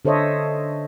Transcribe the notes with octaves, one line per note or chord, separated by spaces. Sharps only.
D3 A4 C5 C#5 D#5 E5